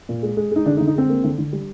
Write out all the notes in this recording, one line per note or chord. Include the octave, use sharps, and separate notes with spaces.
A#2
G#3
G#3
G#3 D#4
D3 D4
D#4
D3
D#4
G#3 C4
A#3
D3
D3
G3